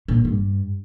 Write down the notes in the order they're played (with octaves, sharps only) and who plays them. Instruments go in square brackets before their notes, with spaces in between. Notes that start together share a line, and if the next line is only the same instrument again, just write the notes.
[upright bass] A#2
G2